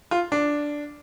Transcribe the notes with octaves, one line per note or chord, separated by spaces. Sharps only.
F4
D4